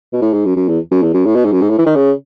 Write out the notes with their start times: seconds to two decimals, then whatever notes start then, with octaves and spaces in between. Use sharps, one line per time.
0.13 B2
0.22 A2
0.33 G#2
0.45 F#2
0.56 F#2
0.68 E2
0.91 F#2
1.02 E2
1.14 F#2
1.26 A2
1.35 B2
1.45 G#2
1.52 F#2
1.61 G#2
1.70 A2
1.78 E3
1.86 D#3
1.96 C#3